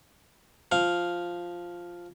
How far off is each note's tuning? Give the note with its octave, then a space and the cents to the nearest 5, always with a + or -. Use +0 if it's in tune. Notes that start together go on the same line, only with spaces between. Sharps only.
F3 +0 F5 +0